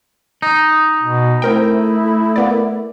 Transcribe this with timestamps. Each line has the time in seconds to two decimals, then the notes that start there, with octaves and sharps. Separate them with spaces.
0.42 D#4
1.03 B2
1.42 A3 C4 E4 A#4 G5
2.36 A#3 B3 D5